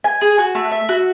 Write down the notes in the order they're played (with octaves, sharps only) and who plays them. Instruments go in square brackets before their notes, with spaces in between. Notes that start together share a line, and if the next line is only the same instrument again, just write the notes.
[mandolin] G#5
G#4
F#4
A3
E5
F#4